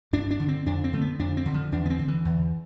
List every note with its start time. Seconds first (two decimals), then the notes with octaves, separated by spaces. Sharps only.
0.13 G2 D4
0.31 D4
0.40 D3
0.48 C4
0.66 F2 D4
0.84 C4
0.93 D3 A3
1.01 B3
1.19 F2 D4
1.37 C4
1.46 D3
1.54 F3
1.72 E2 D4
1.86 B3
1.90 C4
1.99 D3
2.08 E3
2.25 E2